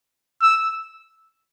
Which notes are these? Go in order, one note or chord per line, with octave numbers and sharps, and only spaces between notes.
E6